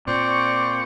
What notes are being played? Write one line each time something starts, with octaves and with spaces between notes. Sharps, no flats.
A#2 C4 D5 C#6